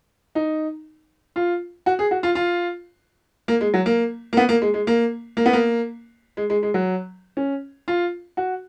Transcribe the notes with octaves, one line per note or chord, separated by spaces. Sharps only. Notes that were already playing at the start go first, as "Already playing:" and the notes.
D#4
F4
F#4
G#4
F#4
F4
F4
A#3
G#3
F#3
A#3
A#3
B3
A#3
G#3
G#3
A#3
A#3
B3
A#3
G#3
G#3
G#3
F#3
C#4
F4
F#4